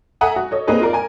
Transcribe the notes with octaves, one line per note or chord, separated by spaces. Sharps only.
A4 E5 F#5 G#5 A#5 D#6
F#4
A4 C#5 D#5
A#3 C4 D#4 G#4 A4 B4
F4 A#4 D5
A#4 G#5